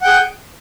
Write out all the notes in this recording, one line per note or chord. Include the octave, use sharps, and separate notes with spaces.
G#4 F#5 G5